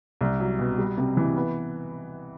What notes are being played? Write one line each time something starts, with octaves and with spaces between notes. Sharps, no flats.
C2
F#3
B2
G3
C3
E3
B3